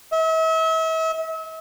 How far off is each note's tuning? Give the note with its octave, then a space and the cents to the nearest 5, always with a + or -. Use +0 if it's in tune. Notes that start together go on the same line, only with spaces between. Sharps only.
E5 -40